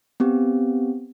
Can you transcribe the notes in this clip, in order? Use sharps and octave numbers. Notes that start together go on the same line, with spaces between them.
B3 C4 G4